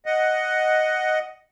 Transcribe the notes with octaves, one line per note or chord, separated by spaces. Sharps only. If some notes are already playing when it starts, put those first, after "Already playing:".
D#5 F#5